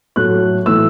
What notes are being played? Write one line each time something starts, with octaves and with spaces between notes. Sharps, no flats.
A2 F#3 A3 F#6
A2 E3 A3 E6